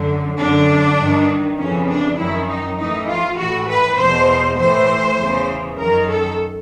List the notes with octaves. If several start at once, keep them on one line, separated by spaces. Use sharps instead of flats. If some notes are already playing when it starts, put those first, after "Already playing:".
Already playing: F#2 D3
F#2 D3 D4
G2 D#3
F2 C#3 E3 C#4
D4
F#2 D#3 E4
D#4
A2 E3 D#4
F4
A2 E3 F#4
B4
E2 B2 C5
A2 E3 C5
E2 C#3 E3
F#2 D#3 A#4
A4